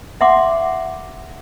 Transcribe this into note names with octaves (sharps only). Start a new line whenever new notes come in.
E5 F#5 C6 D6